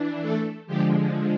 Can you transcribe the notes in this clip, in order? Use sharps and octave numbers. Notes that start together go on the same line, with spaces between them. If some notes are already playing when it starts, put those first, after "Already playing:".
Already playing: E3 D4
A3 A4
D3 F3 G#3 G4